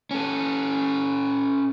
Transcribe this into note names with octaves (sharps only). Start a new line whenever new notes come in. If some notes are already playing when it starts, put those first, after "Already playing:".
C#4 A4